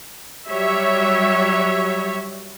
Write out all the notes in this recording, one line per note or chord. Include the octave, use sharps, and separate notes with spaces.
F#3 G3 C#5 E5